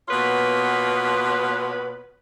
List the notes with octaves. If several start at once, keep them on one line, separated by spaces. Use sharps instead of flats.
B2 A#3 B3 F4 B4 C#5